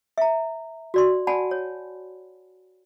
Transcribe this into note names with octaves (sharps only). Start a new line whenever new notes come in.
E5 A#5
F#4 D5 C6
D5 F#5 G#5 A5 B5
C#5